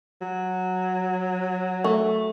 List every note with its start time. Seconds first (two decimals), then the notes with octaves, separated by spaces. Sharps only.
0.22 F#3
1.84 A3